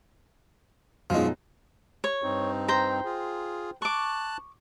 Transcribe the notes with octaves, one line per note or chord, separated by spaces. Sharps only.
F#2 B2 F3 G#3 D#4
C#5
G2 C4 D#4
C5 G5 A#5
F4 G#4
A5 C#6 D6 F#6